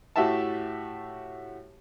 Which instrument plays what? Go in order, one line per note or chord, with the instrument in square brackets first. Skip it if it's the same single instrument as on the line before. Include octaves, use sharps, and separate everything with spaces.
[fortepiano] A2 F#4 G4 E5 A5